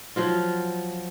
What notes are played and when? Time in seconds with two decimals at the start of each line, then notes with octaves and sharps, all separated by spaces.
0.16 F3 F#3 F4